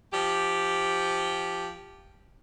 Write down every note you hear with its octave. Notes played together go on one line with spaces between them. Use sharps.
F3 G4